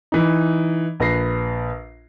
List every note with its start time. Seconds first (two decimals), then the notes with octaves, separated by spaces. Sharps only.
0.12 E3 D#4
1.00 A#1 B4 A#6 C7